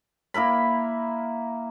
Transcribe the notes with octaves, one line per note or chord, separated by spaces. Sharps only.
A#3 E4 A#4 B5